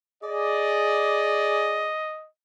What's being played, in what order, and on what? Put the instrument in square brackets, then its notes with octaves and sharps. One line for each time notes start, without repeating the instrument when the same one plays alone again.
[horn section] G#4 D5 [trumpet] D#5